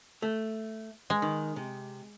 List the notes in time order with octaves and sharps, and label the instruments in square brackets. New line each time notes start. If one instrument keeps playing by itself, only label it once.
[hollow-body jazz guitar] A3
[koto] G#3
[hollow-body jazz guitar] D#3
C3